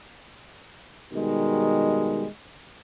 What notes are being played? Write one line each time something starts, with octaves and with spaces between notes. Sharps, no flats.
B2 D#3 G3 G#3